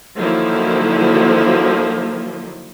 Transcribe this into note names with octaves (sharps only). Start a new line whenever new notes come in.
D3 D#3 F3 F#3 A#3 E4